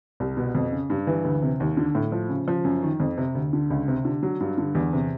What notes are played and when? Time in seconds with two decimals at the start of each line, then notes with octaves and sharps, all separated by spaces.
0.20 C2
0.37 B2
0.55 F2
0.72 C#3
0.90 G2
1.07 E3
1.24 D2
1.42 C3
1.60 D#2
1.77 D3
1.95 A2
2.12 F3
2.29 C#3
2.48 F3
2.65 F#2
2.83 D#3
3.00 F2
3.18 C3
3.35 D2
3.53 D3
3.70 C#2
3.88 C3
4.05 D3
4.23 F#3
4.40 G2
4.58 D3
4.75 E2
4.93 C3